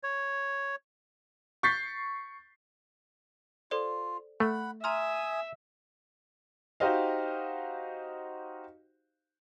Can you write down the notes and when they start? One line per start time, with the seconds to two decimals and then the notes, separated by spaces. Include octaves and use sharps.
0.03 C#5
1.63 C#6 G6 A6 B6 C7
3.71 F4 A4 C5 D5
4.40 A3 F#5 B5
4.84 E5 G#5 A#5 C6 D#6 F6
6.80 D#4 F#4 G4 C5 D#5 F5